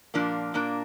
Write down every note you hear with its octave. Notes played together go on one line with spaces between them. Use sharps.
A#2 F3 A#3 D4
A#2 A#3 D4